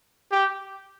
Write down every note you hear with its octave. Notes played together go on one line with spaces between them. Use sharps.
G4